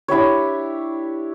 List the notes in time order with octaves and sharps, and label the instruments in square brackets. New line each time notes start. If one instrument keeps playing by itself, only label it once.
[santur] D4 E4 G4 C#5